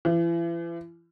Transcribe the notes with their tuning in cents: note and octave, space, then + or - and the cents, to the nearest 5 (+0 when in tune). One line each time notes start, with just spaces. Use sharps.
E3 +40